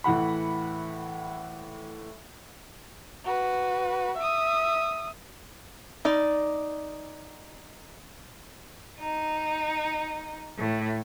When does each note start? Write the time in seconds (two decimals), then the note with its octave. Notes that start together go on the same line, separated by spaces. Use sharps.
0.04 A2 E3 F#5 B5
3.25 F#4 B4
4.18 E5 D#6
6.05 D#4 D5
9.00 D#4
10.58 A2